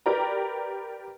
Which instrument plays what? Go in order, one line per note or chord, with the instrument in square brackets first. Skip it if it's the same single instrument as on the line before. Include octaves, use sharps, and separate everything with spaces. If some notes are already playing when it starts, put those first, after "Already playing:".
[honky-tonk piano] G4 A#4 B4 D5 A#5